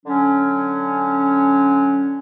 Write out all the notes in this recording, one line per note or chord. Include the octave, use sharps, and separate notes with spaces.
D3 F#3 C#4